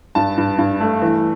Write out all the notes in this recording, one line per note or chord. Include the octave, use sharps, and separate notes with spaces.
G2 A5
G2
G2
A3
E3